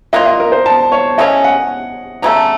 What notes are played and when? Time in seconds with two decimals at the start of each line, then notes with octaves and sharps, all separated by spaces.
0.13 F#3 A#3 F4 D#5
0.26 D#5
0.40 A#4
0.52 C5
0.66 A5
0.92 C#5
1.18 C#3 A3 C#4 D#5
1.44 F#5
2.22 C#3 F#3 A3 A#5
2.36 A5